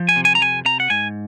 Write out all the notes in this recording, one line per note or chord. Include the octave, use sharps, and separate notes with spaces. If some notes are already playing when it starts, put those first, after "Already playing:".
Already playing: F3
G#5
C3
G#5
A#5
F2 G#5
C3 A#5
F#5
G#2 G#5